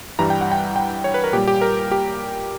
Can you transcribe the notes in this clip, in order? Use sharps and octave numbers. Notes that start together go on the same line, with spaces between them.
G2 E3 G3 A#5
G5
F#5
G5
G5
C#5
B4
A#4
A#2 G3 G4
G4
A#4
G4